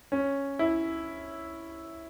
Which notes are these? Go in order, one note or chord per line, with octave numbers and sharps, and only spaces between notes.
C#4
E4